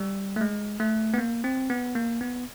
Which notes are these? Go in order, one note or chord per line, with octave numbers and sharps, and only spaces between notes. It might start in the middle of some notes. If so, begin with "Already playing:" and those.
Already playing: G3
A3
G#3
A3
B3
A#3
C4
B3
A#3
B3